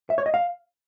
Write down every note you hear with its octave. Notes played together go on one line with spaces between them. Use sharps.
E5
C#5
D#5
F5